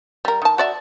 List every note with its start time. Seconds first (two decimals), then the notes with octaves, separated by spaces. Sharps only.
0.25 G3 A#4
0.42 D#3 A5
0.58 F#4 D5 E5